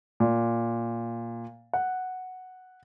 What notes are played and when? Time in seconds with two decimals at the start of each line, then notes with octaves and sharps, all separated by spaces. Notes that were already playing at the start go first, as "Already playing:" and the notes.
0.20 A#2
1.73 F#5